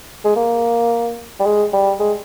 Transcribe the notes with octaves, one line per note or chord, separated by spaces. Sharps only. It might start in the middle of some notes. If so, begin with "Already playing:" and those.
G#3
A#3
G3
G#3
G3
G#3